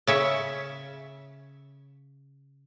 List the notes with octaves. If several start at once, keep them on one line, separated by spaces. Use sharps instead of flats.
C#3 C#4 E5